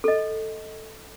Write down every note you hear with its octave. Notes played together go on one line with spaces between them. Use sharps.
A4 D#5